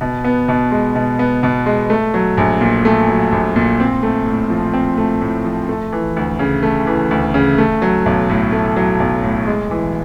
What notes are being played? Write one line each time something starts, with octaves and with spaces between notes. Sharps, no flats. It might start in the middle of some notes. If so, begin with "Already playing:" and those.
B2
B3
B2
G#3
B2
B3
B2
G#3
A3
F#3
A#1
A#2
A3
F#3
A#1
A#2
C4
A3
A2
F3
C4
A3
A2
F3
A3
E3
D2
C#3
A3
E3
D2
C#3
A3
F#3
B1
A2
A3
F#3
B1
A2
G#3
E3